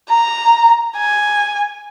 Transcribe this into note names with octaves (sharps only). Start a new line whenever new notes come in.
A#5
G#5